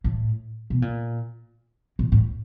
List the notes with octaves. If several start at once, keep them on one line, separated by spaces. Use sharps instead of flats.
A2
B2
A#2
A#2
A2